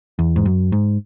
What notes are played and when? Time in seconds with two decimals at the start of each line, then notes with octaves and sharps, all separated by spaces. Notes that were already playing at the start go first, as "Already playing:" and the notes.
0.19 E2
0.36 G#2
0.46 F#2
0.72 G#2